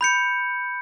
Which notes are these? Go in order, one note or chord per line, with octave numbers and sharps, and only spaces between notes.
B5 G6 C#7